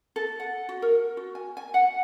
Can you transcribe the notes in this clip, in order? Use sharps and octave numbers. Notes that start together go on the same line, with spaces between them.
A4
F#5
F#4
A#4
F#4
G#5
G#5
F#5